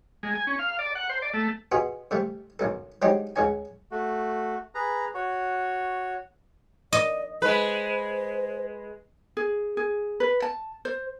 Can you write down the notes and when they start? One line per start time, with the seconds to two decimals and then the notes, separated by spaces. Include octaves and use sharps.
0.23 G#3
0.35 G#5
0.47 C#4
0.59 F5
0.79 D5
0.95 F#5
1.09 C5
1.22 D5
1.34 A3
1.72 B2 F4 F#4 G#4
2.11 C3 G3 A3
2.59 B1 F#2 A4
3.02 F#3 G#3 C4 D4 D#4 G4
3.36 C#2 C#3 C#4 G#5
3.91 A3 F#4
4.75 G#4 B4 A#5
5.14 F#4 C#5
6.93 D5 D#5
7.42 G#3 B4 C5
9.37 G#4
9.77 G#4
10.20 B4
10.42 A5
10.85 C5